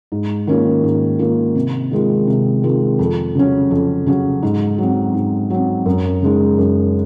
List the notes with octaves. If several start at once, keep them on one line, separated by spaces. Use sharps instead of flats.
G#2
D#3 A#3 C#4 F4
G#2
D#3 A#3 C#4 F4
C3
D#3 G#3 C4 F4
C3
D#3 G#3 C4 F4
F2
C#3 F#3 C#4
F2
C#3 F#3 C#4
G#2
F#3 C4
G#2
F#3 C4
F#2
C#3 G#3 D#4
F#2